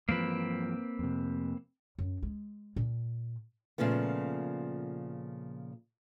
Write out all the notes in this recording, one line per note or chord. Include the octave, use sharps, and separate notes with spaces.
G2 E3 F3 A#3 C4 B4
F2 C3
F#2
G#3
A#2
A#2 C#3 F3 A3 B3